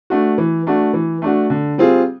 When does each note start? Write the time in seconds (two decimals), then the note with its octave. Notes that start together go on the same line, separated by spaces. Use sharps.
0.10 A3 D4 F#4
0.38 E3
0.67 A3 D4 F#4
0.94 E3
1.22 A3 D4 F#4
1.50 D3
1.78 G3 C4 F4 G#4